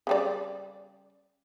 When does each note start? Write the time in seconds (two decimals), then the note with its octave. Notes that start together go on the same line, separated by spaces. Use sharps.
0.07 C#3 G3 D5